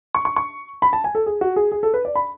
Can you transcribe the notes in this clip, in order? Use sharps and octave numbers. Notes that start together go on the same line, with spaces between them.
C#6
C#6
C#6
B5
A5
G#5
A4
G#4
F#4
G#4
G#4
A4
B4
D5
B5